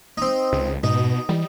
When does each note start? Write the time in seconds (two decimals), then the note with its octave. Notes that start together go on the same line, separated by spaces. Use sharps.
0.17 C4 D#4
0.53 C#2
0.83 G#2 B2 D#4
1.29 E3 G3